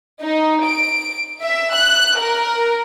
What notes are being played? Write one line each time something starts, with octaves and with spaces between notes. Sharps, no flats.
D#4
D7
E5
F#6
A#4